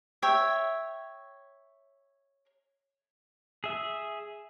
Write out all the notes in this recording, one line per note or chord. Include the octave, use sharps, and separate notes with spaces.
C#5 E5 G5
G#4 E5